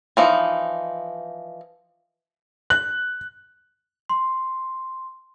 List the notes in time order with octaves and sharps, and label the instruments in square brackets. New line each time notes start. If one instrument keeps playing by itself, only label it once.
[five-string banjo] E3 F3 D#4
[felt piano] F#6
[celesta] C6